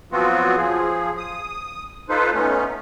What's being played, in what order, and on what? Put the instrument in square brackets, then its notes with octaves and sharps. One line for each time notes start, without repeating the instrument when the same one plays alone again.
[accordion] F3 F#3 B3 C4 F4 F#4
F3 G#4
D#6
D#4 F4 A4 B4 C5
A3 B3 C#4 D#4